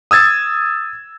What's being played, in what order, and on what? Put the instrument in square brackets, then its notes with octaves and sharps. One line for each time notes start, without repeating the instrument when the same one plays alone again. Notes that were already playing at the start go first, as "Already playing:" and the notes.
[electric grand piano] D#6 E6 G#6 A6